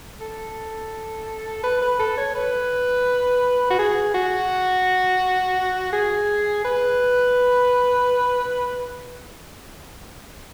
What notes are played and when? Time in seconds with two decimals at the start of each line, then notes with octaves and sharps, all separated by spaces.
0.20 A4
1.63 B4
1.81 B4
1.99 A4
2.17 C#5
2.35 B4
3.70 F#4
3.79 G#4
4.14 F#4
5.92 G#4
6.64 B4